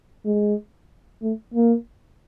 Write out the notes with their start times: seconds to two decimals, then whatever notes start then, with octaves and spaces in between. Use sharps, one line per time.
0.25 G#3
1.22 A3
1.54 A#3